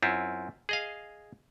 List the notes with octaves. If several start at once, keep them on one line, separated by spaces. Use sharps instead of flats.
F#2 C4 E4 F4
G#4 D#5 F5